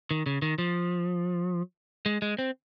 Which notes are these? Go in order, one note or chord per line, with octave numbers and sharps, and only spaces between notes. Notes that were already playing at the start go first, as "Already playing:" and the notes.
D#3
C#3
D#3
F3
G#3
G#3
C4